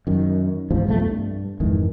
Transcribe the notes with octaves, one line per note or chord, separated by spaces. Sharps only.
F#2 D#3
E2 G#2 F3
B1 F2 E3 A3
G2
F2 G#2 D#3 E3